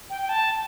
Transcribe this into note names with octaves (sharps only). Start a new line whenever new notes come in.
G5
G5
A5